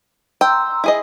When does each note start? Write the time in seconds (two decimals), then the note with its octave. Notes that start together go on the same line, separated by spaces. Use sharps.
0.41 G5 A#5 C6 E6
0.84 E4 G#4 D#5